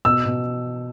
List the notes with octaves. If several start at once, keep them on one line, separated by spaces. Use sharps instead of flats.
B2 E6
B2